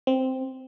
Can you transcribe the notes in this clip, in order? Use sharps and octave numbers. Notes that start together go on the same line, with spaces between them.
C4